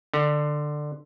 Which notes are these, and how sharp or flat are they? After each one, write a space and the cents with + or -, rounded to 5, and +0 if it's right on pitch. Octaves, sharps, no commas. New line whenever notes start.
D3 +15